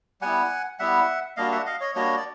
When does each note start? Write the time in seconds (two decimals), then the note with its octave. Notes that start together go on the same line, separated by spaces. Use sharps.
0.21 G3 B3 E4 F#5 G#5
0.79 G3 B3 E4 E5 F#5
1.37 G3 A#3 D4 F#4 D#5 F5
1.52 E5 F#5
1.66 D#5 F5
1.80 C#5 D#5
1.95 G3 A#3 D4 F#4 C#5 D#5
2.17 D5